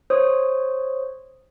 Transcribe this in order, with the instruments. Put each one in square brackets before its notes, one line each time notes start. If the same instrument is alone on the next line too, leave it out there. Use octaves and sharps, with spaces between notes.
[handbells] C5 C#5 D#6